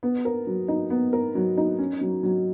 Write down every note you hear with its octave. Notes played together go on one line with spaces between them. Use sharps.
B3
A#4
F#3
D#4
B3
A#4
F#3
D#4
C#4
F#3
F#3